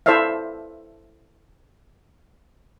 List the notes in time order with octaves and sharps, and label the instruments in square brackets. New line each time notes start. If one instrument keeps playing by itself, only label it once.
[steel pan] E4 A4 C5 D5 E5 F5